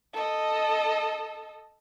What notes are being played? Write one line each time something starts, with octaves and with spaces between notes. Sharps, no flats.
A4 D#5